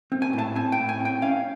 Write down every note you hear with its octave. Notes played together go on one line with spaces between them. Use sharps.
C4
G#5
A2
A5
C4 G#5
G5
A2
G#5
C4 G5
C#4 F5